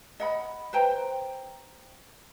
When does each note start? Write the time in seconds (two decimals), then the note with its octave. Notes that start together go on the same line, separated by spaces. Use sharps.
0.20 D#5 F#5 B5
0.73 B4 C5 G5 A#5